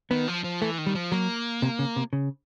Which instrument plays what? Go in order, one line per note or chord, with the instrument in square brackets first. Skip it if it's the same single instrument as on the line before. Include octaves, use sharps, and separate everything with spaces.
[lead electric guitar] D#3 [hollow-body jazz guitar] B3
[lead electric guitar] F3
F3
[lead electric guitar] E3 [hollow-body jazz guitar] A3
[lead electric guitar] D#3
[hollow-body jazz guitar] G3
[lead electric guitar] F3
[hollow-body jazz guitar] F#3 [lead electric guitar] A#3
[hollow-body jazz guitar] C3
C#3
C3
C#3